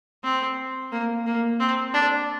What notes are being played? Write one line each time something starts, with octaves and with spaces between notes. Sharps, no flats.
C4
A#3
A#3
C4
D4